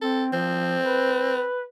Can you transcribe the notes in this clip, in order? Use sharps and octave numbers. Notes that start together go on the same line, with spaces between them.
C4 A4
F3 C4
B4